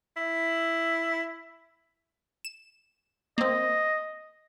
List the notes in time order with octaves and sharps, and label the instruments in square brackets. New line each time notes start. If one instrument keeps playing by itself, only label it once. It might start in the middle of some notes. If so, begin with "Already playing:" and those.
[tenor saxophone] E4
[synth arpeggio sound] E7
[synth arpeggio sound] A#3 C4 [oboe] D#5